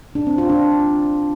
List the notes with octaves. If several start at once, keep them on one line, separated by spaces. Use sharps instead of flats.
D4
C4
F4
D4